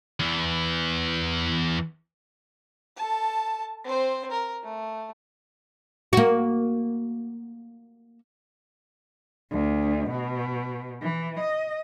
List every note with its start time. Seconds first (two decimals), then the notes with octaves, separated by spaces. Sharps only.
0.20 E2 E3
2.97 A4 A5
3.84 C4 C5
4.31 A#4
4.63 A3
6.13 A#3 F#4
9.51 D2
10.09 B2
11.02 E3
11.40 D#5